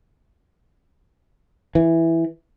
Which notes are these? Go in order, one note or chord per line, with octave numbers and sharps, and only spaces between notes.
E3